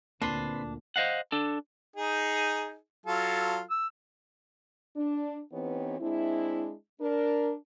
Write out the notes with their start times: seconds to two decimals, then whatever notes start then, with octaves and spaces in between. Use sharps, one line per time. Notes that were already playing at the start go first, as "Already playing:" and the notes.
0.22 D2 A#2 D3 A#3 C4 D4 B4 C6
0.96 C5 D#5 F5 F#5
1.32 D4 A4
1.96 D#4 G#4
3.06 F#3 F4 A4
3.70 E6
4.96 D4
5.53 E3 B3 C4 D#4 G4 C#5
6.00 G#3 C4 D4 E4
7.01 D4 A#4